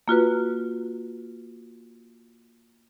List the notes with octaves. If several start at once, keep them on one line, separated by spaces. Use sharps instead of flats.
A#3 F4 F#4 B4